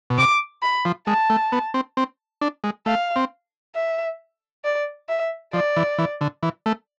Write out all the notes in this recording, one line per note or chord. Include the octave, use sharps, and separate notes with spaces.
B2
C3 D6
B5
F3
G#3 A5
A3
B3
C4
C4
D4
G#3
A3 F5
C4
E5
D5
E5
F3 D5
E3
E3
D3
E3
A3